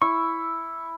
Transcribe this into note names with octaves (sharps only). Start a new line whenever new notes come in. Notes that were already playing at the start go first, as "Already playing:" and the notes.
E4 C#6